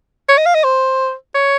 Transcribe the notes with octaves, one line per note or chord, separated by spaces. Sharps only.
C#5
D#5
F5
D#5
C5
C#5